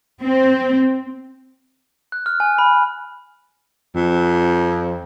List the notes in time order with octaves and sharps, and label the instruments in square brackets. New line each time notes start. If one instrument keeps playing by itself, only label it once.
[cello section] C4
[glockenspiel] F#6
F6
G#5
B5
[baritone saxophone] F2